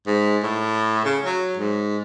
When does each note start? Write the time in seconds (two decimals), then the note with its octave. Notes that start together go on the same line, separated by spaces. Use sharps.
0.06 G#2
0.43 A2
1.05 C#3
1.25 F#3
1.57 G#2